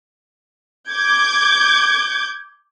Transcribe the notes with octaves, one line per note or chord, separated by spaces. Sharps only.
D6 G6 G#6